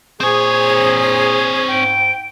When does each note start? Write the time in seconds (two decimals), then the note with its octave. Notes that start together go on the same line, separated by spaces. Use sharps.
0.21 A#2 A#3 C4 G#4 C5 C#5
1.69 G#2 G5